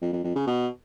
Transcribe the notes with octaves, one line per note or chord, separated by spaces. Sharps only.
F2
F2
F2
C#3
B2